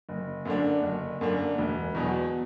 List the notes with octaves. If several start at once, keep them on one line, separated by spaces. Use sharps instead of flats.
F#1
F#2 D3 A#3 D4
F#1
F#2 D3 A#3 D4
E1
E2 B2 F#3